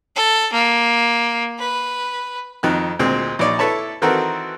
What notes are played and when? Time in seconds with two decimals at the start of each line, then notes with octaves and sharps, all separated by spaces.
0.16 A4
0.53 A#3
1.59 B4
2.63 F2 D#3 F#6
2.99 D2 A#2 G#3 C4
3.39 A#1 D#4 C#5 D5
3.59 E4 A4 B4 C#5 A5
4.02 D#3 E3 C4 F#4 A4 A#4